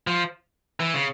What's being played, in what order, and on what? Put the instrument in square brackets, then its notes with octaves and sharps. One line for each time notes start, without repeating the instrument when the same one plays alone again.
[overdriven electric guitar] F3
E3
C#3